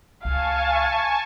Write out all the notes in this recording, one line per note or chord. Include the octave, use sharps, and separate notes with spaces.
C#2 F5 G#5 A5 C#6